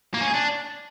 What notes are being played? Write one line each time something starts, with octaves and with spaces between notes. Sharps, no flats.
A#3
C#4
G#4
D4